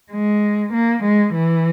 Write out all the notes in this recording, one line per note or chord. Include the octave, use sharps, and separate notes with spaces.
G#3
A#3
G#3
E3